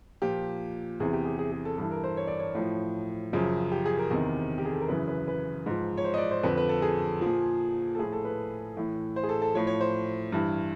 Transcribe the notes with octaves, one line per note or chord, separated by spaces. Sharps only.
A#2 F3 G4
E2 C3 E3 G#4
G4
G#4
G#4
G#4
A4
G2 E3 A4
A#4
C5
C#5
D5
C#5
A2 F3
F#2 C#3 F3
G4
G#4
A#4
E2 C3 D#3
G4
G#4
A4
A#4
F#2 C#3 E3 B4
B4
B4
G#2 F3
C#5
C5
D#5
D5
C5
F2 D3 F3 B4
B4
A4
G#4
F3
A#2
A4
A2 F3 G#4
A4
B4
A2 E3
C5
G#4
A4
A4
A2 F3 C#5
C#5
C5
G2 E3